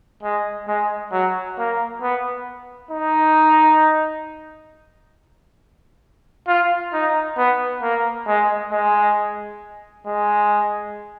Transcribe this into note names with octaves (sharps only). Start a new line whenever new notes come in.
G#3
G#3
F#3
A#3
B3
D#4
F4
D#4
B3
A#3
G#3
G#3
G#3